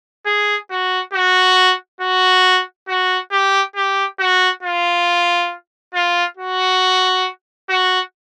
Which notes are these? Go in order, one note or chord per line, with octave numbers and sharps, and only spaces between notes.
G#4
F#4
F#4
F#4
F#4
G4
G4
F#4
F4
F4
F#4
F#4